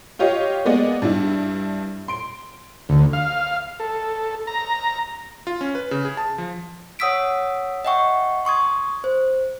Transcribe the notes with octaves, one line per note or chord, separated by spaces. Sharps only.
F4 G4 C#5 D#5 F5
G#3 A#3 B3 G#4 D5 D#5
G2 D4 E4
C6 D7
D2
F5
A4
A#5
F4
C#4
B4
C#3
G#4
A5
F3
C#5 F#5 D#6 E6 B6 D7
D#5 E5 F#5 G5 C#6
C6 C#6 D#6 G#6
C5